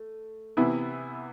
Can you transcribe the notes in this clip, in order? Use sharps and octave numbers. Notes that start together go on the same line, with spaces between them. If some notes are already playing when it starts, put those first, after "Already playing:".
Already playing: A3
C3 E3 B3 E4